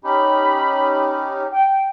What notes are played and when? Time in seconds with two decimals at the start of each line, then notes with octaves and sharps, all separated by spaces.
0.04 C#4 D#4 G4 B5
1.52 G5